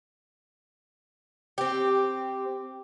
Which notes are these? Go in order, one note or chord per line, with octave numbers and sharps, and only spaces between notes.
C4 G4